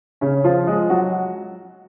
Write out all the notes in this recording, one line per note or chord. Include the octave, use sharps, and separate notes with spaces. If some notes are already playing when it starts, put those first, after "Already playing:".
C#3 C#4
F3 F4
G#3 G#4
F#3 F#4